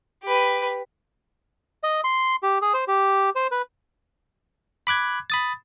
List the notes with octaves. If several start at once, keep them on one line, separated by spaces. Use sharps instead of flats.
G4 B4
D#5
C6
G4
G#4
C5
G4
C5
B4
B5 D6 F#6 G#6
B5 D#6 A6